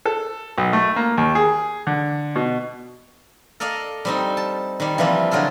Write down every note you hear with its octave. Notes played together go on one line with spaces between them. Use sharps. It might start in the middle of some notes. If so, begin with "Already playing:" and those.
A4
B1
A3
A#3
D#2
G#4
D3
B2
A4 A#4 D5 D#5 F5
G3 C4 D#4
A5
D#3 G3
E3 F3 G3 A#3 C4
D3 F#3 F4 G#4 A4